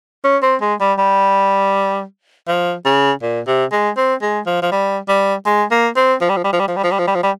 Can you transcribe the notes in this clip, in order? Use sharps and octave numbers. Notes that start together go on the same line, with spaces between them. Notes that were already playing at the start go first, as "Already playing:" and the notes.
C#4
C4
G#3
G3
G3
F3
C#3
A#2
C3
G#3
C4
G#3
F3
F3
G3
G3
G#3
A#3
C4
F3
G3
F3
G3
F3
G3
F3
G3
F3
G3
F3
G3
F3
G3